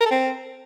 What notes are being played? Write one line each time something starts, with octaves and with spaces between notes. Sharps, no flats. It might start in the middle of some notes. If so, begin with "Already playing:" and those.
A#4
A4
C4